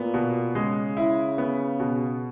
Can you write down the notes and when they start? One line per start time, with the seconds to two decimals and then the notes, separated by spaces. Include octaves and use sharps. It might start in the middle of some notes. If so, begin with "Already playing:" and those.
Already playing: A#2 B3
0.14 B2
0.55 C#3 G#3
0.97 E4
1.38 B3
1.80 B2